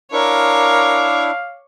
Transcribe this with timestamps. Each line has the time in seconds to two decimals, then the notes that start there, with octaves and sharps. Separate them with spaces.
0.12 D4 E4 A#4 C#5 F5 D6